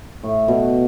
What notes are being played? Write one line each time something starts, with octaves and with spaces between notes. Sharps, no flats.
A2
B2